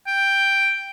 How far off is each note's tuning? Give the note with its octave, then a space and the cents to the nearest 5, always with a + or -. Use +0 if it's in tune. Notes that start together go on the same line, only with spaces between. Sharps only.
G5 +5